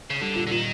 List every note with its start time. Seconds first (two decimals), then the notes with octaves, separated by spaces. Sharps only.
0.10 C#3
0.20 D3 G3
0.35 A#2
0.47 D3
0.51 A#2 D#3